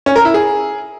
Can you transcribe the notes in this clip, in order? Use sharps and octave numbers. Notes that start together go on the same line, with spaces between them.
C#4
A#4
E4
G#4